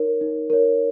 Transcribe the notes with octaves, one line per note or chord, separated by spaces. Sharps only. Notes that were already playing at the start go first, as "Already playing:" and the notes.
Already playing: D#4 A#4 C#5
D#4
A#4 C#5